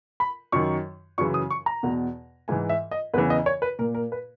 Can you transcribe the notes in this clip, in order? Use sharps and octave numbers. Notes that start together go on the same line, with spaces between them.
B5
F#2 D#3 C#6
F#2 C#3 E3 C#6
D#6
C#6
A#5
E2 B2
G#2 E3 G#5
E5
D#5
E2 C#3 E3 B4
D#5
C#5
B4
A#2 A#4
A#4
B4